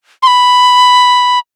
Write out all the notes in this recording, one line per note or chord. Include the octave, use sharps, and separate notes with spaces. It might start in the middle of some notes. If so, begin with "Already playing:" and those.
C6
B5